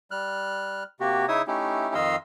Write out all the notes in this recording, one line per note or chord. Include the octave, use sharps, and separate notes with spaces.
G3 F6 F#6
C3 A#3 F#4 G4
C#3 D#4 E4 C#5 E5 D#6
A3 C#4 D#4 E4 G4
F2 D#3 D#5 F5 C6 E6